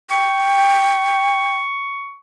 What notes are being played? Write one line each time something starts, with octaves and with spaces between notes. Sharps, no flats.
G5 C#6